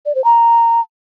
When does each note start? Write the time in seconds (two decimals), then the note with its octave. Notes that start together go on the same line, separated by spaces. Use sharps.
0.06 D5
0.15 C5
0.24 A#5